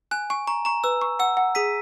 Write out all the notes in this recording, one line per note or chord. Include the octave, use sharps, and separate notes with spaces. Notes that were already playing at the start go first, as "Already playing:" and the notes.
G#5 F#6
G#5 C#6
A#5 C#6
A#5 C#6
B4 E6
C#6
F#5 E6
F#5
G#4 B6 D#7